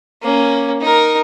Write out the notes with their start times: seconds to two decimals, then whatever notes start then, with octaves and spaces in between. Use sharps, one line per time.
0.22 A#3 C#4
0.81 D#4 A#4